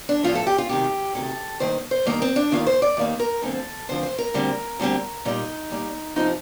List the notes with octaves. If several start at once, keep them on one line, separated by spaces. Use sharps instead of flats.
D4
A2 F3 A3 F4
A4
G4
F4
D2 C3 D#3 G4
D2 C3 D#3 A4
G2 D#3 A#3 C5
C5
G2 D#3 A#3 A#4
C4
D4
D#2 D#3 A#3 F4
C5
D5
D#2 D#3 A#3
A#4
D2 D3 F3 C4 A4
D2 D3 F3 C4 C5
C5
A#4
D2 D3 G3 C4
D2 D3 G3 C4
A#2 G3 A#3 D#4
A#2 G3 A#3
C3 F3 C4 D#4